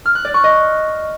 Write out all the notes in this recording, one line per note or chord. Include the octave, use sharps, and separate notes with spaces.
F6
F#6
D5
C#6
D#5